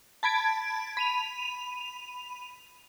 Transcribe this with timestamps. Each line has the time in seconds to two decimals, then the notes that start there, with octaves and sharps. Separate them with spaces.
0.23 A5 B5 G#6 D7
0.97 B5 D#7 F7